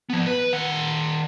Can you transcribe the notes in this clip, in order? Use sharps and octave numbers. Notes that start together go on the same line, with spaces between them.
F3 B3
B4
D#3 F#5